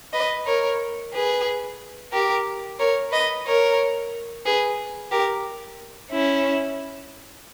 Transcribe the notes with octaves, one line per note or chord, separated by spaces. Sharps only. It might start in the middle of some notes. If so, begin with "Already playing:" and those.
B4 D#5
A#4 C#5
G#4 B4
G4 A#4
A#4 C#5
B4 D#5
A#4 C#5
G#4 B4
G4 A#4
C#4 E4